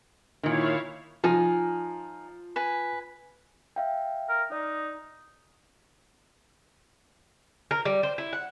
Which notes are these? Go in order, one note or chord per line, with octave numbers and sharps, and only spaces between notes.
A#2 D#3 E4 C#5 F5
F3 D#4 G#5
B4 G#5
E5 F5 G5
A#4
D#4 D5
A#4
G3
C5
E4
F#5